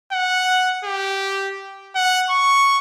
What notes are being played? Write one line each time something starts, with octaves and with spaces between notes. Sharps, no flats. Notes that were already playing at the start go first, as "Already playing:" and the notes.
F#5
G4
F#5
C#6